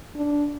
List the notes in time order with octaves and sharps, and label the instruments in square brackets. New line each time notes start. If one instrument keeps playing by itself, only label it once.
[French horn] D4